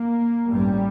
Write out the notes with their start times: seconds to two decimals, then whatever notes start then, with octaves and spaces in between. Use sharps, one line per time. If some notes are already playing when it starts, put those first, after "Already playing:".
Already playing: A#3
0.52 A1 G2 G3